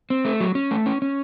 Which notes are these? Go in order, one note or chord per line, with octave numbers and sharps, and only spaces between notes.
C4
A3
F#3
C#4
A3
C#4
C#4